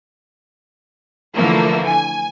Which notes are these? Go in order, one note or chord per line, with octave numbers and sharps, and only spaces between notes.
D3 E3 F3 A3 A#3
G#5